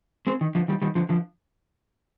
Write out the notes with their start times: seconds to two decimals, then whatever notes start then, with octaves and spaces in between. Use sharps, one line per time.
0.27 G#3 C4
0.41 D#3
0.55 D3 F3
0.68 D#3 G3
0.82 D#3 G3
0.95 D3 F3
1.09 D3 F3